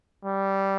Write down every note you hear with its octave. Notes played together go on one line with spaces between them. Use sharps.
G3